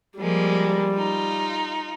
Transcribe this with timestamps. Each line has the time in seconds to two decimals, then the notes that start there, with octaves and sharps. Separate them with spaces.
0.19 F3 G3 G#3 A#3
0.95 D#4 F4